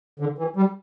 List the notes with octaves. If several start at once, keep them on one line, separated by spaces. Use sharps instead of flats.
D3
E3
G3